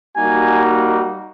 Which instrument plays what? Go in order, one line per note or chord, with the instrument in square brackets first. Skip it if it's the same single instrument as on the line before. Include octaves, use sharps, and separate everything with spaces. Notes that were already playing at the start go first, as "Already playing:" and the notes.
[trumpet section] G3 A#3 D#4 F#4 G#5